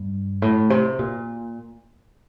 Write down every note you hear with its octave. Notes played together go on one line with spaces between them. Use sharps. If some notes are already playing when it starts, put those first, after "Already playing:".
Already playing: G2
A2
C3
A#2